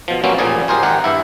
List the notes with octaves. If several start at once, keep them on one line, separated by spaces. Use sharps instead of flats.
B2 F3
B2 F#3 G3 A#3 C4 C#4
A1 A#2 F3 G3 G#4 D5
G4 G#4 A#4 C5 G#5
G#1 D#3 G4 A#4 F#5
G2 E4